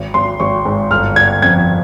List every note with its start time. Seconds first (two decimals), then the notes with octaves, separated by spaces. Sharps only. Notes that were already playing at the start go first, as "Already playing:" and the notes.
Already playing: G#1
0.14 G#1 C6
0.40 G#1 C#6
0.65 G#2
0.91 G1 F6
1.16 G1 G#6
1.42 F2 G#6